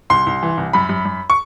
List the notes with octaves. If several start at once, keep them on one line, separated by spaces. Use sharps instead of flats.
C2 C6
C2
E3
C2
F#2 B5
F#2
F#2
C#6